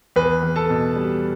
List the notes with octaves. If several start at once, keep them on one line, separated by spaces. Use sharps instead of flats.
E2 B4
E2
A4 A5
B2
G3